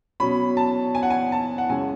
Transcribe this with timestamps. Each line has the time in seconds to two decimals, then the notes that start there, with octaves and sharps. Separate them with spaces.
0.20 B2 F#3 C#4 B5
0.57 A5
0.95 G#5
1.03 F#5
1.10 G#5
1.32 A5
1.58 F#5
1.70 F#2 C#3 G#3 C#4 G#5